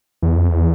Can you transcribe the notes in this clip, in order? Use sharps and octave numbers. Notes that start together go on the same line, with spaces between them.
E2
F2
E2